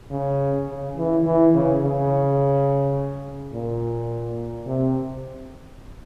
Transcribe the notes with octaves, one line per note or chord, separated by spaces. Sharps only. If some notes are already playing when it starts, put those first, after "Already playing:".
C#3
C#3
E3
E3
C#3
C#3
A#2
C3